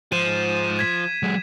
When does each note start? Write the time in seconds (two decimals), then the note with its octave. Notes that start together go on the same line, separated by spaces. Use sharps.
0.12 G#2 F3 C5 D#7 E7
0.79 G#6 B6
1.23 F#3 G#3